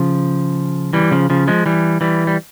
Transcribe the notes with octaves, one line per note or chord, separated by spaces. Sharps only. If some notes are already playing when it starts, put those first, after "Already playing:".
Already playing: C#3 F3
E3 G3
C#3 F3
C#3 F3
F3 G#3
E3 G3
E3 G3
G3